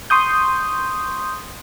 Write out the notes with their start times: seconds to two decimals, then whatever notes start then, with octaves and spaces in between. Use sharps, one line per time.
0.10 C6 C#6 D#6 G6